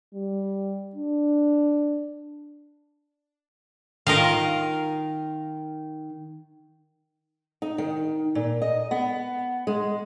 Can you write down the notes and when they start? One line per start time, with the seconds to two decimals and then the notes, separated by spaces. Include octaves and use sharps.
0.13 G3
0.95 D4
4.07 D#3 F4 A#4 D#5 F5
7.62 D#4
7.78 D#3
8.35 A#2
8.62 D#5
8.91 B3
9.67 G#3